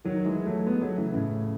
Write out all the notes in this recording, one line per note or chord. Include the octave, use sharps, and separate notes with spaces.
D#3 F#3
E3 G#3
F#3 A3
G#3 B3
F#3 A3
C#3 E3
A2 C#3